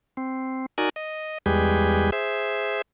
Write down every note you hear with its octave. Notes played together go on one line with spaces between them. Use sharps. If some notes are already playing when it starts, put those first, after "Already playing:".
C4
D#4 F#4 A#4 D5 G#5
D#5
E2 G3 G#3 G4 G#4 B4
G#4 C5 E5